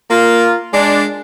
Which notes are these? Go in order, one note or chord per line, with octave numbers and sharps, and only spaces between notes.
A#3 F4
G#3 D4